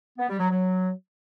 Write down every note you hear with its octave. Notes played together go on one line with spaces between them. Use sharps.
B3
G3
F#3
F#3